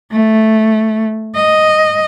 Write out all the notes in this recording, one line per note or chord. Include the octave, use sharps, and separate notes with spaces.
A3
D#5